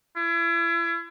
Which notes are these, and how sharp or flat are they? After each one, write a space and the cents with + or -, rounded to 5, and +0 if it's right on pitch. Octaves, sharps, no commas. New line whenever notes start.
E4 +40